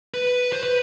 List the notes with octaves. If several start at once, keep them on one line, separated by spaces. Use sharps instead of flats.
B4
C5
B4